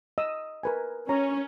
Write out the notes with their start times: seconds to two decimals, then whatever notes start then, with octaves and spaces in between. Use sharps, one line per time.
0.18 D#5 D#6 E6
0.63 A#4 B4 G#5
1.09 C#4 C#5 A#5